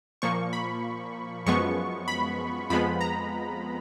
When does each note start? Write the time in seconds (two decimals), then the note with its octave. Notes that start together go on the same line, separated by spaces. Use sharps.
0.22 A#2 F3 A#3 C#6
0.53 B5
1.46 F#2 F3 G#3 B3 C#6
2.08 B5
2.70 F2 F3 G#3 B3 B5
3.01 A#5